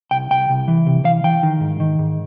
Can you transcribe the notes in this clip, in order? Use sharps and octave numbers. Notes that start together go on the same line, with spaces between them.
C2 G5
C2 G5
C2
E3
C3
E3 F5
E3 G5
D#3
G#2
D#3
G#2